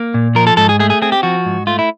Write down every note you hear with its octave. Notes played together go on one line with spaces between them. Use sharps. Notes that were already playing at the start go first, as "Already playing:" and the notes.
Already playing: A#3
A#2
F3 A#4
A4
G#2 A4
G#4
A3 G#4
G#4
C4 G#4
G4
F3 F#4
G#2
A3 F4
E4